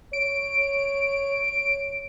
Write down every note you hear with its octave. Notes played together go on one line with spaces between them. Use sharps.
C#5 D7